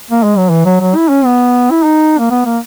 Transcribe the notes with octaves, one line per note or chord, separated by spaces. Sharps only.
A#3
G#3
F#3
E3
F#3
F#3
E4
C#4
B3
E4
D#4
A#3
B3
A#3